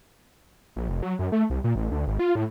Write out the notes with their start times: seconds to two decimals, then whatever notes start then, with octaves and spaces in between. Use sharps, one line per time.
0.76 A#1
0.89 F1
1.03 F#3
1.19 F#2
1.32 A3
1.50 C2
1.64 A#2
1.76 A1
1.91 D2
2.07 G#1
2.19 F4
2.35 A2